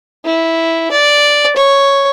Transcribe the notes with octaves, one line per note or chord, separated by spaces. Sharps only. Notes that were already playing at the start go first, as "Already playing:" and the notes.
E4
D5
C#5